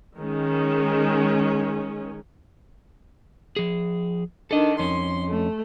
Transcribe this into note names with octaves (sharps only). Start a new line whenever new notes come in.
D#3 G#3 C#4
F3 G#4
D#3 D4 A4 D#5
F2 C#4 C6
A3